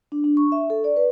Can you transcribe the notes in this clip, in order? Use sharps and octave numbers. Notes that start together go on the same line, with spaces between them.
D4
D4
C#6
E5
A4
D5
B4